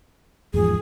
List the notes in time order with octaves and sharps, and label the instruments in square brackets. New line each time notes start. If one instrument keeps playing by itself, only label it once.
[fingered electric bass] E2 G#2 F3 [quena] G#4